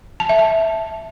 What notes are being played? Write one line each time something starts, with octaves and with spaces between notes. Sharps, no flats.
A5
E5
A5